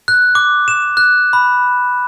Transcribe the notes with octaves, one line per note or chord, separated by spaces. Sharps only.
F#6
D6
E7
F#6
B5